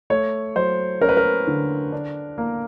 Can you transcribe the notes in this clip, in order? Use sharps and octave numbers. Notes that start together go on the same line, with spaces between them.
A3 C#5
F#3 C5
C#4 A#4
B4
A#4
D3
D4
A#3